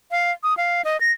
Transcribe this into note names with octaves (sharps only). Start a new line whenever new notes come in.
F5
D#6
F5
D#5
A#6